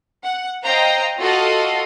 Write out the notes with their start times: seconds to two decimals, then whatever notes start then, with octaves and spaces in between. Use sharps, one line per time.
0.24 F#5
0.64 C5 D#5 F5 G5 A#5
1.20 F4 F#4 A4 D#5 F5